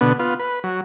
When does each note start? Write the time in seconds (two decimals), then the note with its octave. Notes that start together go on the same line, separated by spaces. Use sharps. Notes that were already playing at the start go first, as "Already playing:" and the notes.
0.01 B2 D3 B3
0.19 B3 F4
0.39 B4
0.64 F#3